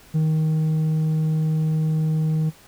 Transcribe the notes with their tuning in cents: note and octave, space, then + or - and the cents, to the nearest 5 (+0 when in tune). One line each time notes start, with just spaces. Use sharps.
D#3 +15